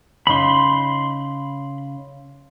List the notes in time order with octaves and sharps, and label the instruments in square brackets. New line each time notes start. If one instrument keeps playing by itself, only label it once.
[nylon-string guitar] C#3 D#4 [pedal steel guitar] B5 C6